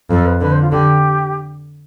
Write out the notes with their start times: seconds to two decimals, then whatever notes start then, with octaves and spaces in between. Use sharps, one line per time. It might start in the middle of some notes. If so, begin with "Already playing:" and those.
0.10 F2 A4
0.25 B4
0.41 D3 B4
0.51 C5
0.61 F4
0.72 D3 G4